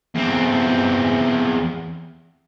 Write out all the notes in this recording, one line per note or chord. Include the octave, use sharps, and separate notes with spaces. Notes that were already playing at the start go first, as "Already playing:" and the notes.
E2 C4